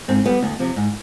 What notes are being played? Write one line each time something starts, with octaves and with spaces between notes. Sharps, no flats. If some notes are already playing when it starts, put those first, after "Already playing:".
G#2 C4
G3 B3
D2
C3 F3
G#2